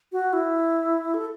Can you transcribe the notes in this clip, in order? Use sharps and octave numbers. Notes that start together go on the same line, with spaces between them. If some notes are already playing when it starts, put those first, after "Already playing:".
F#4
E4
A4